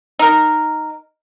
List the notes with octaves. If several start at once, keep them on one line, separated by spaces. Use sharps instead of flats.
D#4 A#4